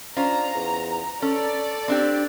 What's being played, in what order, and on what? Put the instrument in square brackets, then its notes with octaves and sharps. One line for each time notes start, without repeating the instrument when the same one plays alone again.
[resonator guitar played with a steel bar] C#4 F4 C5 [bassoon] D4 [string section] A#5
[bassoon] E2
[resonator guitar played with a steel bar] C#4 [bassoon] A4 [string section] D5
[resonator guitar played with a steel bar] C4 D4 G4